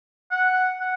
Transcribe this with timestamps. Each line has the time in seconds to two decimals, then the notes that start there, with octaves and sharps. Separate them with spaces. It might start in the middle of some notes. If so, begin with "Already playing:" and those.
0.31 F#5
0.81 F#5